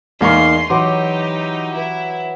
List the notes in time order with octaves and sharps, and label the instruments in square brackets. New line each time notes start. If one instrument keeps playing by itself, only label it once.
[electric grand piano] E2 F5 C#6 [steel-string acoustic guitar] A#3 D#4 [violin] C6
[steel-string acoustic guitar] E3 [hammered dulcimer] F#3 [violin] D#4 G4 [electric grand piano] C6 D6
[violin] E4 [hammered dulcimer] B4